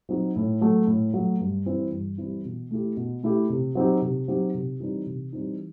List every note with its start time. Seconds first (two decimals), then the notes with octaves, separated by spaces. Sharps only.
0.09 F#3 C4 D#4 F#4
0.36 A2
0.61 F#3 A3
0.87 A2
1.14 F#3 A3
1.40 G2
1.66 E3 G3 C4 E4
1.92 G2
2.18 E3 G3 C4 E4
2.45 B2
2.71 A3 E4 G4
2.97 B2
3.23 A3 E4 G4
3.50 C3
3.75 F#3 C4 D#4 G4
4.02 C3
4.28 F#3 C4 D#4 G4
4.54 C3
4.80 E3 G3 C4 D#4
5.06 C3
5.33 E3 G3 C4 D#4